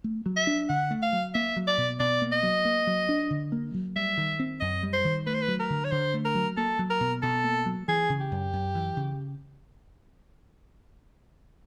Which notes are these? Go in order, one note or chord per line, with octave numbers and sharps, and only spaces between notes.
A3
F#3
E5
D4
D3 F#5
A3
F5
F#3
A#3 E5
F#3
D5
B2
B2 D5
A#3
D#5
F#3
A#3
F#3
D4
D3
A#3
F#3
G3 E5
D#3
C4
F#2 D#5
G3
C5
D#3
A3 B4
C5
B4
F#3
A#4
D3
C#5
D3 C5
A3
A#4
F#3
A#3 A4
F#3
A#4
B2
B2 A4
A#3
F#3
E3 G#4
C#3
G4
F#2
F#2
E3
C#3